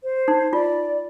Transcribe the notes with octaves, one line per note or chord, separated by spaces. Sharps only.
C5
D#4
F4 D5